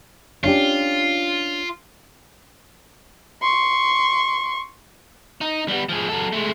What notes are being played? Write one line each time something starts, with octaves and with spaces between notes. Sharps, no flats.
C#4 D4 F4 G4
C6 C#6
D#4
G3 B3
F3 G#4
F#3 A4
G#3 A3